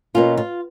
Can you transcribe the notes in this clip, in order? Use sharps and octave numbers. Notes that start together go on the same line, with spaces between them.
B2 A#3 C#4 F4
F4